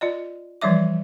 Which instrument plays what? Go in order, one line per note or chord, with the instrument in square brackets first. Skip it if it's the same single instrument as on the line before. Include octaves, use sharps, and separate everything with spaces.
[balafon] F4 D5 D#5
E3 F3 G3 D5 E5 D6